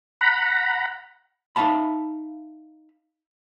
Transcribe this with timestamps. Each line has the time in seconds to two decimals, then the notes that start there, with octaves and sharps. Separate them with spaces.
0.21 F#5 A#5 B5
1.56 D#4 E5 F5 A5 B5